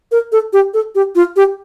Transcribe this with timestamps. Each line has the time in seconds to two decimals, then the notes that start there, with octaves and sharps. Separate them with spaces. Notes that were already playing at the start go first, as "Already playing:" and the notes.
0.12 A#4
0.32 A4
0.53 G4
0.74 A4
0.95 G4
1.15 F4
1.36 G4